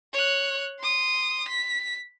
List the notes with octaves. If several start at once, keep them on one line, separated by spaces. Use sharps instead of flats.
C#5 F#6
C6 D#6
B6